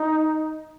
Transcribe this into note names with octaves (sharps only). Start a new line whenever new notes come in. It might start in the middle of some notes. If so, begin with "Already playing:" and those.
Already playing: D#4